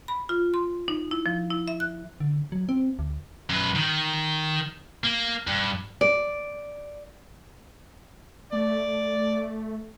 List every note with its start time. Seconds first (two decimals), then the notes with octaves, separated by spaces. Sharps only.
0.08 B5
0.29 F4
0.54 C6
0.88 D#4
1.11 E4
1.26 F3
1.50 E4
1.68 E5
1.80 F#6
2.20 D3
2.52 F#3
2.69 C4
2.99 D2
3.50 F#2 B4
3.75 D#3
5.04 A#3
5.47 G2
6.01 D5
8.53 A3 D5